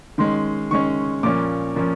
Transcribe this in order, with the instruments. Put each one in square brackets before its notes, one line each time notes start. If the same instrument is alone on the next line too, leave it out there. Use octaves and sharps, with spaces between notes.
[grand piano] D#3 G#3 C#4 C6
D#3 G#3 C#4 C#6
A#2 F3 A#3 C#4 D6
A#2 F3 A#3 C#4